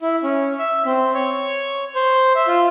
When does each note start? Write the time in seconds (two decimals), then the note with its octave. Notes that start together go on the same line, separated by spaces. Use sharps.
0.01 E4
0.23 C#4
0.59 E5
0.85 C4
1.14 C#5
1.95 C5
2.35 E5
2.47 F4